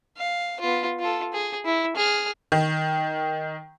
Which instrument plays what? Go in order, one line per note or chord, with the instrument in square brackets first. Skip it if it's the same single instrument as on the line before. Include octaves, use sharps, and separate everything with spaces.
[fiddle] F5
B3 F4
F4 A4
G#4
E4
G#4 F6
[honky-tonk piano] D#3